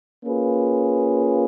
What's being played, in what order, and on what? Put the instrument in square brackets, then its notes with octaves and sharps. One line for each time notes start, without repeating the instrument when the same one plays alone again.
[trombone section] A#3 C#4 F4 G#4 B4